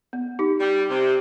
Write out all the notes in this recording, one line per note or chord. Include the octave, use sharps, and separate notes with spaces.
B3
D#4 G4
G3
C3